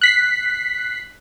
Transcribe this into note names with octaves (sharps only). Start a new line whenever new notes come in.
F#6 B6 C7